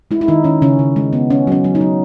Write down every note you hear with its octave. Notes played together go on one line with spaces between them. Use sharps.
G#3 E4
E4
D#3 D#4
D#3 C#4
C#3 C#4
C#3
G#3
B3
C#4
F#3 C#4
F#3
D#4
F#3